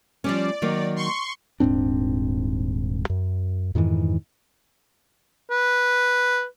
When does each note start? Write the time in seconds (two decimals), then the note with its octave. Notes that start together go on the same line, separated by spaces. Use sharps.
0.24 F3 G3 C#4 D5
0.62 D#3 F#3 A#3
0.96 C6 C#6
1.60 D#1 G#2 C4 D4
3.10 F#2
3.75 F2 G#2 D#3 E3
5.51 B4